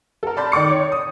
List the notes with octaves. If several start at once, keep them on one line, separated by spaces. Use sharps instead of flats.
A4 A#4
D5 A5 B5 C6 G6
D#3 D5 D6 C#7
C#5
D#6